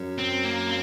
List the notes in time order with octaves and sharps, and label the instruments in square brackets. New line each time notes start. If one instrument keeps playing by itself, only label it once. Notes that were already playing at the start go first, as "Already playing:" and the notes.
Already playing: [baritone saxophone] F#2
[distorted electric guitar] C4
A#3
C4